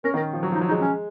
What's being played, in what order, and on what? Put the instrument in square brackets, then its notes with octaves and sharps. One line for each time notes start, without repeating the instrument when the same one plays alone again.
[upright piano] C#4 [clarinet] A#4
[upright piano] D#3
[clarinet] A#4
[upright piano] F3
[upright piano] F#3 [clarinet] F#4
[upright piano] F3
[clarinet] D#4
[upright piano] F#3
[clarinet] D#4
[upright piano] G#3
[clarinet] C#4